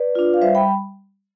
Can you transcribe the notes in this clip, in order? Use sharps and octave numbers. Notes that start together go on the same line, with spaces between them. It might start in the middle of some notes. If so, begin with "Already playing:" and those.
Already playing: B4 D5
D4 F4
F5
G3 C5 E5
G5 B5